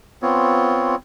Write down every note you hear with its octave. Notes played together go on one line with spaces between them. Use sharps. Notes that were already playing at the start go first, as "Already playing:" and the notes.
B3 C4 F4 C#5